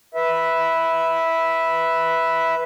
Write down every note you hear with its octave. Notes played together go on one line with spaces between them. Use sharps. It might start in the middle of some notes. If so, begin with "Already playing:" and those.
B4 E5